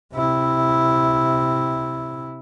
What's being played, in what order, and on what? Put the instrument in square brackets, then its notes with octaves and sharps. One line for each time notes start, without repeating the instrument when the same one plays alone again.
[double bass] C3 E4